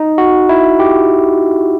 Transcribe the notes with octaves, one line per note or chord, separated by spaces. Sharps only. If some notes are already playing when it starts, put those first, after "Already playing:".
Already playing: D#4
F#4
E4
G4